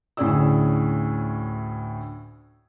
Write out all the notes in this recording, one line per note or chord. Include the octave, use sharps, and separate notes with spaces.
D2 A2 C#4 G#4 D5 E6